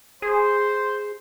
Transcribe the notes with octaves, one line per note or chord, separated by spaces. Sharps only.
G#4 C5